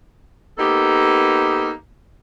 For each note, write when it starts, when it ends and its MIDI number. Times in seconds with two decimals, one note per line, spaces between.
0.58 1.70 58
0.58 1.70 59
0.58 1.70 63
0.58 1.70 67
0.58 1.70 69